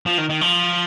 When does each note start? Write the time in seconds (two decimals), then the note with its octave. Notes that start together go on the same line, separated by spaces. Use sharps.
0.06 F3
0.18 D#3
0.29 D#3
0.41 F3